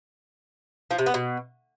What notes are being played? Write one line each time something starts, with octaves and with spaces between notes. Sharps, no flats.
F3
C3
B3
B2